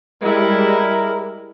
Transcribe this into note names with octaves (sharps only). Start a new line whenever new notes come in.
G3 G#3 E4 A#4